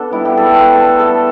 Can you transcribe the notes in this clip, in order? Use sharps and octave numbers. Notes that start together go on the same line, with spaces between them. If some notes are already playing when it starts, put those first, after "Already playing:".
Already playing: B3 D4 A4
G3 E4
G4
A4
A3 B4
A4
A3
A4